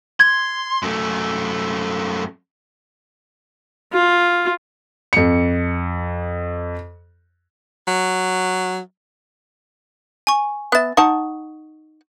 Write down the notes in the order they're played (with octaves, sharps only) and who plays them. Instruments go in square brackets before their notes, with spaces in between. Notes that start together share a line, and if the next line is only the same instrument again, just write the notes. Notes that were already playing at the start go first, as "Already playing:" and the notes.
[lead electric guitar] C6 [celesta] G#6
[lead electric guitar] F#2 A3
[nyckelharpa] F4
[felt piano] F2 C#7
[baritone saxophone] F#3
[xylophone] G#5 C#6
[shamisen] B3 E5 [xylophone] F#6 A6
[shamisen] D#4 F#5 A5 [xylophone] C#6